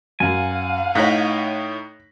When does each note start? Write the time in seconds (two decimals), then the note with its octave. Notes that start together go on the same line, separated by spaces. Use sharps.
0.20 F#2 F5 F#5 G#5
0.95 A2 D#4 C#5 F#6 A#6 B6